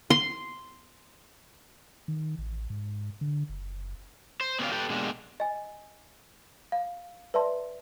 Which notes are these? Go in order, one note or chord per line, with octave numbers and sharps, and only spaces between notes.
C6
D#3
A1
G#2
D3
F#1
C5
B3 C#4 G4 B4 D5 F5
G4 A4 B4 G5
B2 D3 G#3 A#3 D4 G4
D#5 G#5
F5
B4 D5 E5 A5 C6